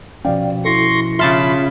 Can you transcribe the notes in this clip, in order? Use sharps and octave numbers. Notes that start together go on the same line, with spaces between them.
B2 F3 C#4 D5 F5 G5
E4 F#4 A4 C6 C#6 A#6
C#3 F4 E5 A5 B5 C6 F6